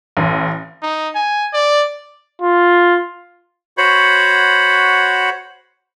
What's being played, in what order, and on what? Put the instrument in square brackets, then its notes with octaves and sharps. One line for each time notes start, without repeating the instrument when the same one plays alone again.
[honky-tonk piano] A1
[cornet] D#4
G#5
D5
[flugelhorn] F4
[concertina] F#4 C5 C#5 F#5 B5